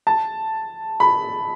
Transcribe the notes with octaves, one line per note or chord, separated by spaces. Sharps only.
A5
B5